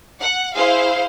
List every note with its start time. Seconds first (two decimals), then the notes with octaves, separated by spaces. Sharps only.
0.20 F#5
0.54 E4 G#4 C5 F5